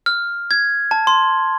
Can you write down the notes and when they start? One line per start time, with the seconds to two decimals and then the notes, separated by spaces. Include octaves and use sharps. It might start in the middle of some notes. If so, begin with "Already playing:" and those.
0.06 F6
0.51 G#6
0.91 A5
1.07 C6